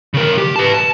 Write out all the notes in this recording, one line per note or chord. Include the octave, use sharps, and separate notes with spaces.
C#3 A#4
G4
B4 A5
A5